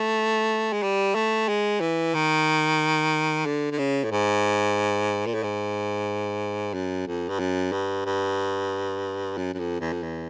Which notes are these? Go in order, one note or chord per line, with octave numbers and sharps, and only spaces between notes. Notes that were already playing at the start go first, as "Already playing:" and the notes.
Already playing: A3
G#3
G3
A3
G#3
E3
D#3
D3
D3
C#3
A2
G#2
A#2
A2
G#2
F#2
F2
G2
F#2
G2
G2
F#2
F#2
F2
E2
F2
E2